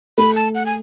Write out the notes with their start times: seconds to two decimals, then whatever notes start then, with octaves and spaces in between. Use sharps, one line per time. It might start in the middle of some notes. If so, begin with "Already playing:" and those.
0.18 A3 B5
0.36 A5
0.55 F#5
0.66 G#5